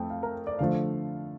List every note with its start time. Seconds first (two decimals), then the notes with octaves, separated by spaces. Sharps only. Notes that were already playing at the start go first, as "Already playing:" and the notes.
Already playing: F2 A3 G5
0.10 F5
0.23 A#4
0.47 D5
0.59 D3 F3 A3 F5